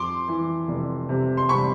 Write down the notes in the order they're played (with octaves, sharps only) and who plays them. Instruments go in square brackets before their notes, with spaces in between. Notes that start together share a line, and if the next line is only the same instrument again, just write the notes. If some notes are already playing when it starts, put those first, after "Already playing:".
Already playing: [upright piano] F2 C6 D6
E3
F1
C3
C6
C3 B5 C#6